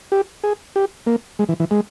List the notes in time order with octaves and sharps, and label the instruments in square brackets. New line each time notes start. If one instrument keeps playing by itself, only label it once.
[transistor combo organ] G4
G#4
G4
A#3
G#3
E3
E3
G#3